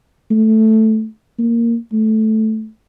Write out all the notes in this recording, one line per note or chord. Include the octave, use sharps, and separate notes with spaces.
A3
A#3
A3